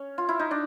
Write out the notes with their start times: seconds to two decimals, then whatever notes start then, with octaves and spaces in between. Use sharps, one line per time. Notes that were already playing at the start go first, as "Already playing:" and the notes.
Already playing: C#4
0.18 F4
0.29 E4
0.39 D#4
0.51 D4